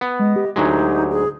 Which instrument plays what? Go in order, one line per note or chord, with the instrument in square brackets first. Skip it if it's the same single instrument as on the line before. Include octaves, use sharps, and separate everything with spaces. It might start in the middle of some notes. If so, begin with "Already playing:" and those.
[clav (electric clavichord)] B3
[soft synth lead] G#3 [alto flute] D#5
[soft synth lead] G4
[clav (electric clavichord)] D2 F#3 G#3 [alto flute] D#4 [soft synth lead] G4
[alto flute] G#4